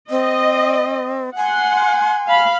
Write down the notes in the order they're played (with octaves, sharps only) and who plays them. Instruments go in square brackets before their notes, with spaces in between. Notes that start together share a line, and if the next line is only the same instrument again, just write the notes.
[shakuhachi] C4 [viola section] D#5
[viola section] F#5 C6 [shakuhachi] G#5
[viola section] F5 B5